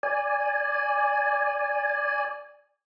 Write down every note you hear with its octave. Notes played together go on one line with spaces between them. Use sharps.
D5 G#5